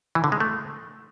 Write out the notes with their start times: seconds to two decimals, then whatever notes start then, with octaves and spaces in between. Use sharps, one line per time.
0.15 E3
0.24 D3
0.32 G#3
0.40 A3